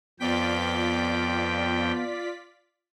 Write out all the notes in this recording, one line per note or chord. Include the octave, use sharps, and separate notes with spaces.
F2 B3 F4 D5 G5 B6